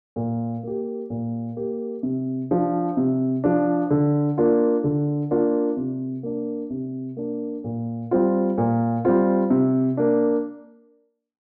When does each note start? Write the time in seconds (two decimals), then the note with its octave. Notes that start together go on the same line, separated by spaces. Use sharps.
0.16 A#2
0.63 A#3 G4
1.10 A#2
1.57 A#3 G4
2.03 C3
2.51 F3 D4
2.97 C3
3.44 F3 D4
3.90 D3
4.38 A#3 D4 F4
4.84 D3
5.31 A#3 D4 F4
5.77 C3
6.23 A#3 D4
6.70 C3
7.17 A#3 D4
7.64 A#2
8.11 G3 C4 F4
8.58 A#2
9.05 G3 C4 F4
9.50 C3
9.97 A#3 D4